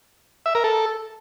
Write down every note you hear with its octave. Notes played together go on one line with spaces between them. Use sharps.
E5
A#4
A4